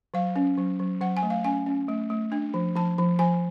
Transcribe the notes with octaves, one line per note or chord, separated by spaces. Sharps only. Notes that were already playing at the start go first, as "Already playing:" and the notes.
F#3 F5
C#4
F#3
F#3
F#3 F#5
G#5
A3
F5
C#4 G#5
C#4
A3
A3
D4
F3
F3 A5
F3
F3 G#5